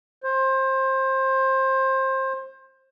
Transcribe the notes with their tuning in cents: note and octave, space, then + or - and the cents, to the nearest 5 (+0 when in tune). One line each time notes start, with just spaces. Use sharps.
C5 +25